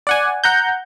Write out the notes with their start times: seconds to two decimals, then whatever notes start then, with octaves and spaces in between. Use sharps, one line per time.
0.07 D5 F#5 G#5
0.44 F#5 A#5 G6